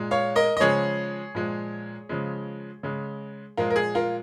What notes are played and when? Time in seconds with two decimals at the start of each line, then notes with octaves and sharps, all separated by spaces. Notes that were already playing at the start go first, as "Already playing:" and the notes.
Already playing: A#2 G#3
0.11 C#5 F5
0.36 A#4 D#5
0.57 D#5
0.60 C#3 F3 G#3 G#4 C#5
1.35 A#2 F3 G#3
2.09 C#3 F3 G#3
2.83 C#3 G#3
3.57 A#2 F3 G#3 F4 A#4
3.70 A#4
3.76 G#4
3.95 F4 A#4